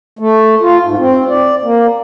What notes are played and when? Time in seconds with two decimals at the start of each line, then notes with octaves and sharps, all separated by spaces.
0.19 A3
0.62 F4
0.85 G#2
0.98 C4
1.29 D5
1.63 A#3